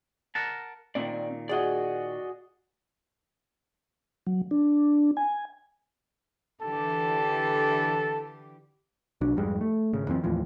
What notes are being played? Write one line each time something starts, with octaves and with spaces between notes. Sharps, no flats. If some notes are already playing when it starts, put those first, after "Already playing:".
A#4 F#5 A5
A#2 D#3 C4 D5
F#4 G#4 D5 D#5
F#3
D4
G#5
D3 E3 G4 A4
B1 F#3 D4
F2 G#2 G3 G#3
A3
G#1 C#3
F#2 E3 C4
D#2 A2 E3 F3